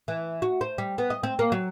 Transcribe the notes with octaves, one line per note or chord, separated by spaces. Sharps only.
E3
F#4
C5
G3
B3
D#5
C4
A#3
F#3